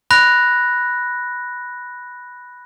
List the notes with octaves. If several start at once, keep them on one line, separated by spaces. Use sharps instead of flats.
B5 F#6 A#6